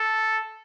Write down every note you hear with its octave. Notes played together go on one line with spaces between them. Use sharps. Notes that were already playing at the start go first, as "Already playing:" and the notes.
Already playing: A4